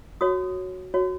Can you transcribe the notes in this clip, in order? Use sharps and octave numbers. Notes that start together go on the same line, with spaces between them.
F#4 C#5 D#6
F#4 C#5